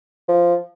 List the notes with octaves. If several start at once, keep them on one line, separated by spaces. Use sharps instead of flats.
F3